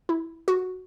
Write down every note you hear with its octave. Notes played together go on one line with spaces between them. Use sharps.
E4
F#4